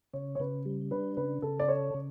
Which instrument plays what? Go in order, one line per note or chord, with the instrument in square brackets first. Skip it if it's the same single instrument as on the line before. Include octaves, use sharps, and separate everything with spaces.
[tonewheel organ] C#3 [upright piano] C#5
[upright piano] C#5
[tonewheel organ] C#3 [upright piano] B4
[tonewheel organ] G3
[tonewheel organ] D4 [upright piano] B4
[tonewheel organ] C#3 [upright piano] B4
[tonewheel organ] C#3 [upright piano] A4
[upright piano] D5
[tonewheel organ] A4 [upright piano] C#5
[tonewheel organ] C#3